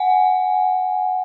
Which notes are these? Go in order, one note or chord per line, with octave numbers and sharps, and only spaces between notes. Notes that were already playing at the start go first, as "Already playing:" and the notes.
Already playing: F#5 G#5